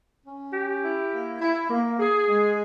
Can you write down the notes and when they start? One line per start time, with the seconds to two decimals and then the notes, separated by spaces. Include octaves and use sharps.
0.24 C#4
0.53 G4
0.82 E4
1.12 A#3
1.41 E4
1.70 A#3
1.99 G#4
2.28 G#3